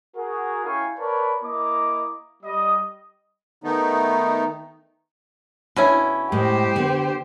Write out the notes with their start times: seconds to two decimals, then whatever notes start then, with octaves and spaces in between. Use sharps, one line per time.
0.16 F#4 G#4 A#4
0.64 C#4 E4 F5 G5 G#5 C#6
0.98 A#4 B4 C#5 D5 A5 B5
1.43 A#3 E4 D#5 A#5 D6
2.43 G3 D#5 D#6
3.64 D#3 A3 B3 D#4
5.76 B2 C#4 D4 E4
6.32 A2 G#3 G4 C5
6.76 D3 B3